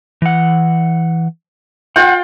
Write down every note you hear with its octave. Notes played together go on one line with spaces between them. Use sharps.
E3 F#5
F4 F#5 G5